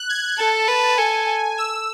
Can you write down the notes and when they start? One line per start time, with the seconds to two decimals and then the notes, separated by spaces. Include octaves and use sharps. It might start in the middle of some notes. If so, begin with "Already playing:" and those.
Already playing: F#6
0.09 G#6
0.38 A4 A5
0.68 B4
0.97 A4 G#5
1.58 E6